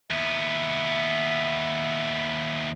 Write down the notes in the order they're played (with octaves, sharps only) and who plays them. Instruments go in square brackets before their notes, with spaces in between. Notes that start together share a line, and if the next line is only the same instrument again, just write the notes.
[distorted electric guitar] D#2 B3 [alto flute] E5